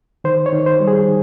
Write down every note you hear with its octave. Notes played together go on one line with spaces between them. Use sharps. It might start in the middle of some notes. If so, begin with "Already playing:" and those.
D#3 C5
C#5
D#3
C5
G3
G#4
D#3